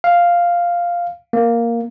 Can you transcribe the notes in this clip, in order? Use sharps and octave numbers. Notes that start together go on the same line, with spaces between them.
F5
A#3